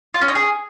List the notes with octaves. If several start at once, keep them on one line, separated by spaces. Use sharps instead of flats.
F4
C#4
D#4
G#4